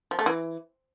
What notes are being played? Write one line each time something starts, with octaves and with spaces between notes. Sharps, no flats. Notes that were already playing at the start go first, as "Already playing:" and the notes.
F3
A3
E3